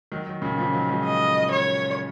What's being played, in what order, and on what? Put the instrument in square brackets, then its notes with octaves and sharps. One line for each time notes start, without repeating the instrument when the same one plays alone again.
[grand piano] D#3 F#3
D#3 F#3
A#2 C#3
C#3 F3
D#3 F#3
F3 G#3
[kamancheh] D#5
C#5